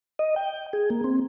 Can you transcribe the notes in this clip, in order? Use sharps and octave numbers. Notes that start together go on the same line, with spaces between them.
D#5
G5
G#4
A#3
C4